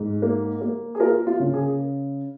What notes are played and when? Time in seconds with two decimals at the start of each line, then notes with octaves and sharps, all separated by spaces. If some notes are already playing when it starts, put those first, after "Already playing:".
Already playing: G#2
0.22 A#3
0.61 A#3
0.95 G#4
1.00 A#3 F4 A#4
1.27 F4
1.40 C#3
1.54 G#4